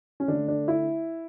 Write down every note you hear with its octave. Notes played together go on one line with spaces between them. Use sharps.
C#4
D3 A3 D4
D4
E4